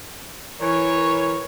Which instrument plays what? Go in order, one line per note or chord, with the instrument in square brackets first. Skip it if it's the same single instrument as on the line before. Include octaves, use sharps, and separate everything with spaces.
[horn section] E3 A#4 C#5